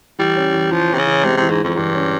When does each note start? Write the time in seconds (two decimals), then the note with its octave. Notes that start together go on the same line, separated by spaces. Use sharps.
0.19 E3 G3
0.36 C#4
0.53 E3
0.71 E3 F3
0.89 C3 C#4
0.98 C#3
1.06 E3
1.23 C3 G#3
1.37 C3 E3
1.50 G#2
1.59 F2 E3
1.77 G2 E3
1.94 C#4